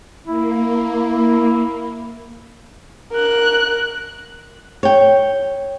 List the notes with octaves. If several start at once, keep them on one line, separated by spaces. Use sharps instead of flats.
A#3 E4
A#4 F#6
C#5 G5